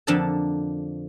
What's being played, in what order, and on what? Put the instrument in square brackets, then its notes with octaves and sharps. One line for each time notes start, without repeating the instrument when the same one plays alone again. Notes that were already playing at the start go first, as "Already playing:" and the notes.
[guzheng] F2 D3 F3 A#3 D4 A5